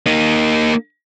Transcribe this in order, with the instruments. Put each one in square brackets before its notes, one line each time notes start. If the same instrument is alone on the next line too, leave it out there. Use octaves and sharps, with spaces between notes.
[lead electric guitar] A#3 D#4